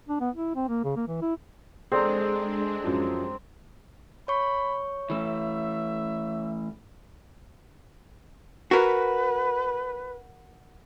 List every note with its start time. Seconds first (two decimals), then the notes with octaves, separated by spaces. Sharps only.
0.09 D4
0.20 B3
0.35 E4
0.55 C4
0.68 A#3
0.84 C#3
0.96 A#3
1.08 E3
1.22 E4
1.92 G#3 C4 D4 G#4 A4 D5 A#5
2.84 F#2 F3
4.28 C#5 B5 C#6
5.10 E3 A3 E5
8.71 F#4 A#4 B4